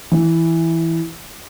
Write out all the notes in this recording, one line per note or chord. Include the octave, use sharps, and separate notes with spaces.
E3